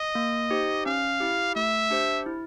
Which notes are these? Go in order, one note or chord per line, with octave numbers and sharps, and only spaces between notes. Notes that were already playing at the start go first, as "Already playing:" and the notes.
Already playing: D#5
A#3
D#4 G4 C5
C#4 F5
E4 G4
A3 E5
D4 G4 C5
E4